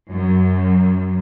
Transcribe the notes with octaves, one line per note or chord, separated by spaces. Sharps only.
F#2